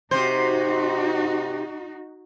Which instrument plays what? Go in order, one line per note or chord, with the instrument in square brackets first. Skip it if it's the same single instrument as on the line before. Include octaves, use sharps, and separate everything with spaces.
[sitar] C3 C5 [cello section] D#4 F#4